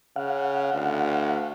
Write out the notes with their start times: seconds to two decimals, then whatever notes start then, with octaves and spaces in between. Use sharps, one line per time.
0.16 C#3 F5 F#5
0.74 D2